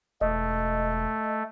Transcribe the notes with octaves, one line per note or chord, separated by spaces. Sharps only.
E1 A3 D#5